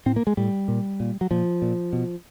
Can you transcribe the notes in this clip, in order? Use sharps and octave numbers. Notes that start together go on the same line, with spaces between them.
A2 C4
A#3
G#3
A2 G3
A#2
A#2
F#3
A#2 F3
A#2
B2